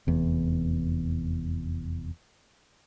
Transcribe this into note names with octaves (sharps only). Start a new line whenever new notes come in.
F1 E2